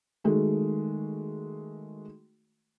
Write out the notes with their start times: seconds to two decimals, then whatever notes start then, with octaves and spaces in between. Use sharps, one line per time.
0.24 D#3 G#3 A3 F#4